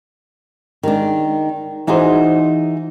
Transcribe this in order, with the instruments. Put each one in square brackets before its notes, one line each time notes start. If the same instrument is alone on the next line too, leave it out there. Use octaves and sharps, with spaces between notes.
[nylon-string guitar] D#3 G#3 D4
E3 D#4 F#4 G#4 C5